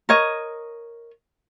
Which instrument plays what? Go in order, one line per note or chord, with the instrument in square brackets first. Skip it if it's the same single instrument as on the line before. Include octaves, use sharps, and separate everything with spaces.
[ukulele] A#4 C#5 D#5